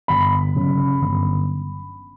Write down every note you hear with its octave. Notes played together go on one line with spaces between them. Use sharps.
G1 B5
F#2 C#3
G1